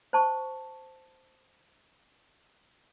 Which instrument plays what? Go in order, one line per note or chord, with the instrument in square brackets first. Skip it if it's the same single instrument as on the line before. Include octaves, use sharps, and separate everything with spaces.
[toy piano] C5 A5 C#6